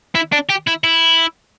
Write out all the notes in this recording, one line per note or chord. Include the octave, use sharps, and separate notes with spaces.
E4
D4
G4
E4
E4